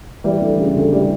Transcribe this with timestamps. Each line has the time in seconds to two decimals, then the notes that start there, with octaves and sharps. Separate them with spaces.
0.24 E3 G3
0.41 D2
0.59 C#3
0.76 D2
0.93 E3 G3